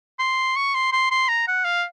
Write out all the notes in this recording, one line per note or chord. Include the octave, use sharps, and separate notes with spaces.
C6
C#6
C6
C6
C6
A#5
F#5
F5